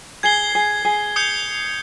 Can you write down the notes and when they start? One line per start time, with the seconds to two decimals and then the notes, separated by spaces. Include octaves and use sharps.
0.23 G#4 G#6 C7 G7
0.55 G#4
0.85 G#4
1.16 D#6 G6 C#7 G7